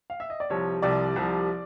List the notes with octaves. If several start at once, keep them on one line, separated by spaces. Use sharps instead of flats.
F5
E5
D#5
D5
C2 C3 F3 C#5
C2 C3 F3 D5
C2 C3 F3